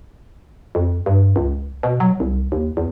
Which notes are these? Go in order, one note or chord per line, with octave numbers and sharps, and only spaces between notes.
F2
G2
C#2
B2
F#3
C2
D#2
E2